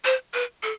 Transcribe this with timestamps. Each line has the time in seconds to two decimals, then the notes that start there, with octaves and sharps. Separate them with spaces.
0.05 C5
0.34 B4
0.63 A4